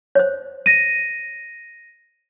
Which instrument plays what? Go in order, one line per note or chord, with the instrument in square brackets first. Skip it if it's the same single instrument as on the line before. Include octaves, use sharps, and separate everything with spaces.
[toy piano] C5 C#5
[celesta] A#6 D#7